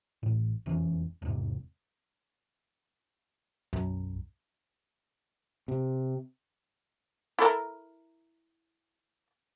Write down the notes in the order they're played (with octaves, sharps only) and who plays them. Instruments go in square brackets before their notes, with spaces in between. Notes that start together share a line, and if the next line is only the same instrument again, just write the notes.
[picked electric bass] A1 A2
E1 F2 E3 C#4
E1 E2 G#2 C3
[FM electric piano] B1 [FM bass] F#2
[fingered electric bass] C3
[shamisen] E4 A4 A#4